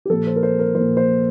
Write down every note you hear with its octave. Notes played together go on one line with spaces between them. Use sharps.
G4
A#2 F3 A4
C5
A#4
C5
A#4
A#2 F3 C5
C5